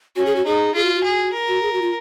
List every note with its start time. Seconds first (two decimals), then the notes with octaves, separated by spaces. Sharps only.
0.16 C#4 F#4
0.26 G#4
0.36 F#4
0.45 D#4 G#4
0.75 F4 G#4
0.84 F#4
0.95 F#4
1.03 G#4
1.33 A#4
1.48 F#4
1.62 G#4
1.73 F#4
1.82 F4